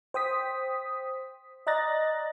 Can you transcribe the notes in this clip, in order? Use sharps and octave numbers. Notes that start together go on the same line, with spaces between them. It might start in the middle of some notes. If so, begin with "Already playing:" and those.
C5 G5 D#6 B6
D5 D#5 A#5 F#6 A6 A#6